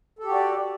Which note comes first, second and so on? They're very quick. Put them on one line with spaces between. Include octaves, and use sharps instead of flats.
A4 G4 F#4 D5